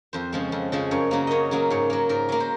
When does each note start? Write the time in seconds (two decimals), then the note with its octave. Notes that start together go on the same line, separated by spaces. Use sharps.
0.13 F2 C5
0.33 C#3 F3 G#3
0.52 F2
0.72 C#3 F3 G#3
0.91 F#2 C#5
1.11 C#3 F#3 A#3
1.27 F#2 C#5 D#5
1.51 C#3 F#3 A#3
1.70 G#2 C#5
1.90 F#3 A#3
2.09 G#2 A#4
2.29 F#3 A#3
2.40 C5